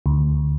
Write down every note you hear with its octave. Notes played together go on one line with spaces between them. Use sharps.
D2